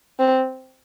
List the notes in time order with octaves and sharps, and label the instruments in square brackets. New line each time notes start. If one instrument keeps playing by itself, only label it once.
[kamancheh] C4